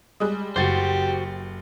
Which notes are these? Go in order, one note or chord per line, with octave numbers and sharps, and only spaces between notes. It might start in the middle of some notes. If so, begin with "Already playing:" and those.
G3 G#3 D#6 F#6
F#1 F#2 C#3 F#4 G4 C5 A6